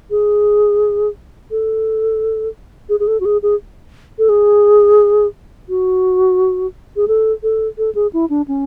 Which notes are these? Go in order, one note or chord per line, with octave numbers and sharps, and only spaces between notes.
G#4
A4
G#4
G#4
A4
F#4
G#4
G#4
A4
G#4
F#4
G#4
A4
A4
A4
G#4
E4
D4
C#4